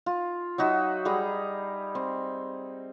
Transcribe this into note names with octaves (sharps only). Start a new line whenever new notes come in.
F4
F#3 D#4 F#4 E5
G3 G#4 A#5 B5
C4